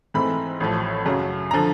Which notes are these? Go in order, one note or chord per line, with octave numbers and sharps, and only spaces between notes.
G#2 E3 A3 C4 B5
A1 A2 F3
F#2 C#3 F#3
D3 F3 A#5